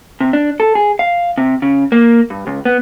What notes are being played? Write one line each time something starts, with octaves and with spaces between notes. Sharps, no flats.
C3
D4
A4
G#4
F5
C3
C#3
A#3
G2
C#2
B3